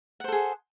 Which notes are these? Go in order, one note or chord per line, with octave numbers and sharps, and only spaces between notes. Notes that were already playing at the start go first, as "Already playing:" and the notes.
G#4 A4 C5 F#5